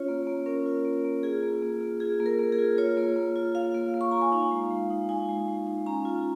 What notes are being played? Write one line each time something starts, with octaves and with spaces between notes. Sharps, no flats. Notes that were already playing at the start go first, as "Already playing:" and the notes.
Already playing: C#4 F4 C#5
A#3
A#3
C#4 A#4
F4
A#3
A#3
F4 G#4
A#3
A#3
F4
F4 G#4
A#3
A#4
A#3
G#4
F4
F4 C#5
A#3
A#3
F4
F4 F5
A#3
A#3
C#6
F4 A#5
G#5
D#4 F5
G#3
G#3
D#4
D#4 G#5
G#3
G#3
D#4
C#4 A#5
F4